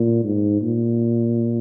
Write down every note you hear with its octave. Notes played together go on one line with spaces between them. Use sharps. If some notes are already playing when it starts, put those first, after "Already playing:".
Already playing: A#2
G#2
A#2